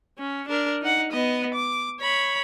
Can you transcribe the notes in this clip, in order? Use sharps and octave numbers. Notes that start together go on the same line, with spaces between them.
C#4
D4 A#4
D#4 F#5
B3 D#5
D6
C#5 B5